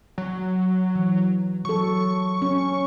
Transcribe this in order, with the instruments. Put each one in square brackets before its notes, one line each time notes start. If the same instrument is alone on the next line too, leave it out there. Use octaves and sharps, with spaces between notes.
[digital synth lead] F#3
[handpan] E3
[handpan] F#3 A4 [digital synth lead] C#6
[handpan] C#4